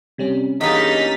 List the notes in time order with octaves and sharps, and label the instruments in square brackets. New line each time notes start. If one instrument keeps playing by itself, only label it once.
[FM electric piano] C3 G3 C#4
[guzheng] E2 G2 [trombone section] A#3 C#4 D#4 [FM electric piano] D#5 [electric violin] A6 B6